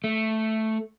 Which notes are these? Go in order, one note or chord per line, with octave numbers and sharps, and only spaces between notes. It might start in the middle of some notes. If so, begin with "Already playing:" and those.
A3